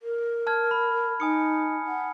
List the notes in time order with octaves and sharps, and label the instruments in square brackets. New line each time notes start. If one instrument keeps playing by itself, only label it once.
[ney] A#4
[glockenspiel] A5 F6 G#6
B5
[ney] D#4 [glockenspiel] G#5 D#6 C#7
[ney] F#5